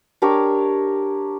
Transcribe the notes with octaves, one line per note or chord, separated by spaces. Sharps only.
D4 G4 A#4 C#5